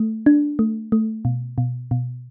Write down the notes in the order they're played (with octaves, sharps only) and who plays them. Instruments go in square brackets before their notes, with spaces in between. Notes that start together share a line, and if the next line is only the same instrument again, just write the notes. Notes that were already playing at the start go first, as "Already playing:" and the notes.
Already playing: [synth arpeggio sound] A3
D4
A3
A3
B2
B2
B2